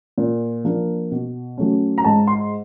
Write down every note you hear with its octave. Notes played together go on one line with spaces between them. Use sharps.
A#2
F3 A#3 D4
B2
F#3 A3 C#4
A#5
G#2 A5
C6